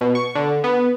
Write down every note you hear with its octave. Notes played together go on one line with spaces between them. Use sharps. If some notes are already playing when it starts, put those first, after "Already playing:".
B2
C#6
D3
B3